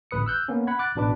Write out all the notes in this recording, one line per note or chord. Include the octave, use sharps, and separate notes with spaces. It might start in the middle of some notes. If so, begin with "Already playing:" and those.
A1 D2 B4 D#6 C#7
E6 F#6 G6
A#3 B3 C#4
F#5 B5 G#6
D6 F#6 A6
A1 B2 D4 B4 D6